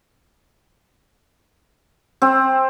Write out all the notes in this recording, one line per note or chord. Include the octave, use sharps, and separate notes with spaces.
C4